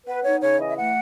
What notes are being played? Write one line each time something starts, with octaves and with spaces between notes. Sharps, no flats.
B3 B4
D#4 C#5
C#3 C#5
E3 D#5
E5
A3 F#5